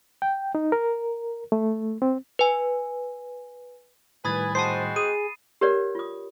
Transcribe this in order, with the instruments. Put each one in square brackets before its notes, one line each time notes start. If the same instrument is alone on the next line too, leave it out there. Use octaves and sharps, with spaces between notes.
[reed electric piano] G5
D#4
A#4
A3
C4
[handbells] B4 G#5
[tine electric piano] A2 D#3 G3 [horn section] B4 G#5 [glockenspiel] B5 D#6 A6
[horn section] G#3 C4 F#4 [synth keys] C5 A5 D#6 [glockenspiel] C7
[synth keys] G#4 [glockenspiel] D#7
[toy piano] G4 A#4 B4 C#5 D5 F#5
F4 D#6